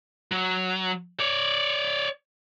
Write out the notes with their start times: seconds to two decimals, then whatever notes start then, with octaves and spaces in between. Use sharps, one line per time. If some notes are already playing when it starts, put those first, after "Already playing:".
0.32 F#3
1.20 C#5 D5